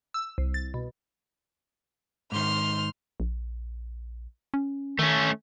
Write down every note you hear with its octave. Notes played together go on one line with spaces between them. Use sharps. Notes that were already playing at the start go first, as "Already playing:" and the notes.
E6
C2
A6
B2
G#2 D#3 C6 F6
A#1
C#4
D#3 A3 C#4